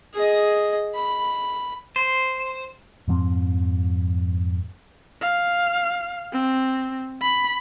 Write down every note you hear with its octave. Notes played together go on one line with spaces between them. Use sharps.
G#4 D#5
B5
C5
F2 G#2 F3 C4
F5
C4
B5